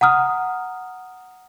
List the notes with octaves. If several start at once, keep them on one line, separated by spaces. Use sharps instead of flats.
F#5 A#5 D#6 F6